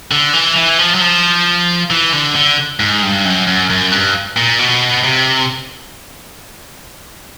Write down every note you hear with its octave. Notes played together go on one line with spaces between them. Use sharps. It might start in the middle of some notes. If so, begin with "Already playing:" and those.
D3
E3
E3
F3
F#3
F3
E3
D3
D3
G#2
G2
F#2
F#2
F#2
G2
A#2
B2
C3